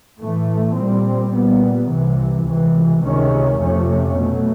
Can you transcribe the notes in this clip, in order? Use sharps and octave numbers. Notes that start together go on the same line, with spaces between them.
A2 E3 A3
A#2 G3 C4
A#2 G3 B3
C2 C3 E3
C#2 C3 E3
C#2 C3 D#3 G#3 C#4
F2 C3 F3 A3 C#4
B2 F#3 A3